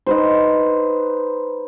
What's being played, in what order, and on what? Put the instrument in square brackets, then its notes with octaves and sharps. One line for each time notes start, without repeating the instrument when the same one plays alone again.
[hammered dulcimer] D#4 B4 C5